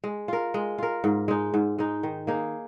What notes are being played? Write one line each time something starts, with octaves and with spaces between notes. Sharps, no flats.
G#3
F4 A#4
G#3
F4 A#4
G#2
G#3 D#4
G#2
G#3 D#4
D#3
A#3 D#4 G#4